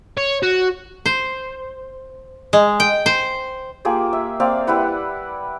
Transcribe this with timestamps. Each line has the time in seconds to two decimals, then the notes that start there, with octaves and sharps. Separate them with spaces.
0.17 C#5
0.43 F#4
1.06 C5
2.53 G#3
2.80 G5
3.06 C5
3.85 A#3 F4 G4 G#4
4.13 E5
4.40 A#3 C4 D5 F5
4.67 G3 E4 B4 F#5